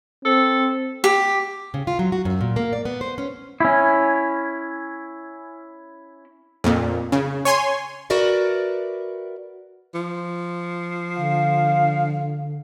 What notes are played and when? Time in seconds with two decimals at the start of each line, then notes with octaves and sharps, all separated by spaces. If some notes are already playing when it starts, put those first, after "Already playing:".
0.25 C4 A4
1.04 G4
1.74 C#3
1.87 F4
1.99 F#3
2.12 F#4
2.25 F#2
2.41 A#2
2.56 A#3
2.73 D5
2.85 B3
3.01 C5
3.18 C#4
3.60 C#4 E4
6.64 F2 A#2
7.12 C#3
7.45 C#5 G#5 C6
8.10 F#4 A#4 B4 D5 E5
9.94 F3
11.17 D3 F5